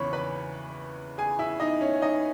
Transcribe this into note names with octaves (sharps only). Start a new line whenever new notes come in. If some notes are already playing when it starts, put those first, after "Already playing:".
Already playing: E2 C#3 E3 C#5 B5 C#6
B4 B5
G#4 G#5
E4 E5
D#4 D#5
C#4 C#5
D#4 D#5